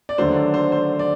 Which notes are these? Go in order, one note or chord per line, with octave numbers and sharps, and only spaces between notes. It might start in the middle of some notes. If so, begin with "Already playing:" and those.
D5
D#2 D3 F#3 A3 C5
D5
C5
C5
D5